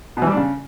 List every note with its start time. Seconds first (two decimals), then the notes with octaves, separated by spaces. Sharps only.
0.17 B2
0.22 E3
0.27 G3
0.32 D4
0.37 C#3